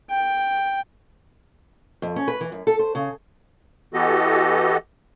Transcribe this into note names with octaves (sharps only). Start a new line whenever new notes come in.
G5
F2
C#4
B4
E3
F#2
A4
C5
C#3
E3 B3 F#4 G4 A4 D#5